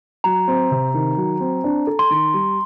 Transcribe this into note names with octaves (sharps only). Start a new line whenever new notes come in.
F#3 A#5
C4
C3
D#3
F#3
C4
D4
A4
C6
D#3
G3